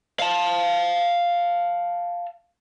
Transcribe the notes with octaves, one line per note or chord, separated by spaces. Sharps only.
F5 A5